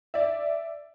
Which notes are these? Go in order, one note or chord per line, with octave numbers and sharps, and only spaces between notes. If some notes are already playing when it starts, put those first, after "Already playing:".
D5 E5